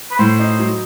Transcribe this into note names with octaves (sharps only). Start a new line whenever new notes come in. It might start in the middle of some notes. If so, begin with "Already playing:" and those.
B4
A2 C5
D#4
F#3